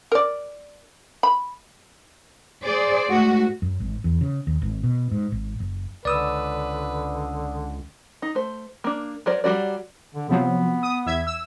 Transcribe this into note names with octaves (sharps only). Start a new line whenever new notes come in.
A#4 D5
B5
G#4 C5 D5
G#2 A3 F#4
F#2
G#1
E2
C#3
D#2
G#1
B2
G#2
G#1
F#1
C#2 D3 B4 D5 D#6 E6
D#4
A3 C5
A#3 D4
F#3 A#4 C5 D5
F#3 G3 F#4 D5
D3
C3 F3 F#3 B3
D#6
E2 E5 G#6
E6